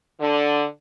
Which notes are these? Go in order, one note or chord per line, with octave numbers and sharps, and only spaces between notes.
D3